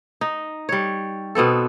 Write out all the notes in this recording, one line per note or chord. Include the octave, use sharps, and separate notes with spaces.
D#4
G3 C#5
B2 B3 C4 A4